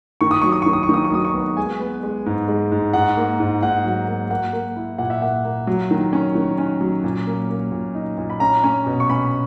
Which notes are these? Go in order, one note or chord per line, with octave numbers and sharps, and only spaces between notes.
D#3 C#6
D#6
F#3 C#6
D#6
D#3 C#6
D#6
C#6
D#3 D#6
C#6
F#3 D#6
C#6
B3
G#3 G#5
B3
G#3
G#2
G#3
G#2
G#2 F#5
A#3
G#2
G#2 F#5
F#3
A#3
A#3 F#5
A#3
E4
A#2 F#5
E5
A#3 F#5
A#3
F#3
D#3
C#4
D#3
C#4
F#3
A#2
A#3
A#3
A#2
D#4
A#2
B5
C#4 A#5
C#4
B2
C#6
C#4 B5